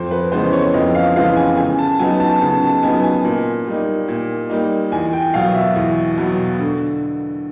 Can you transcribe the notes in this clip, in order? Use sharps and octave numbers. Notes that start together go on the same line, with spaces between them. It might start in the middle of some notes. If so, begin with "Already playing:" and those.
Already playing: F2 C5
B4
C#3 E3 G#3 B3 C5
C#5
F2 D#5
F5
C#3 E3 G#3 B3 F5
G#5
C#3 G#5
A5
F#3 B3 D#4 G#5
A5
C#3 A5
A5
F#3 B3 D#4 G#5
G#5
A#2
G3 A#3 D#4
A#2
G3 A#3 D#4
E2 G#5
G5
B2 F#3 F5
E5
E2
B2 F#3
D3